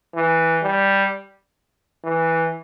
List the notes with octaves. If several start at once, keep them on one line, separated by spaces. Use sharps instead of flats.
E3
G3
E3